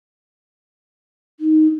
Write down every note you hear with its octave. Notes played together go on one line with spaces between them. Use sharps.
D#4